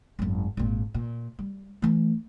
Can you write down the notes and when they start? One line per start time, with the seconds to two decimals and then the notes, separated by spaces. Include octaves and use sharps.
0.19 G#1 F#2
0.57 G#1 A#2
0.94 A#2
1.39 G3
1.82 E3 A3